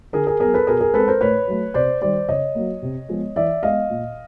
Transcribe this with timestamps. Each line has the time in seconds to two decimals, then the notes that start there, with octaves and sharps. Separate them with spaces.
0.13 D3 G#4 A#4
0.27 G#4 A#4
0.40 F#3 B3 G#4 A#4
0.54 A4 B4
0.67 B2 G#4 A#4
0.80 G#4 A#4
0.94 G#3 C4 A4 B4
1.08 A#4 C5
1.21 A2 B4 C#5
1.48 F#3 A3
1.74 C3 C5 D5
2.02 D#3 G3 C5 D5
2.29 C#3 C#5 D#5
2.55 F#3 A#3
2.82 C3
3.09 F3 G#3 B3
3.36 E3 D5 E5
3.63 G#3 B3 D#5 F5
3.90 A#2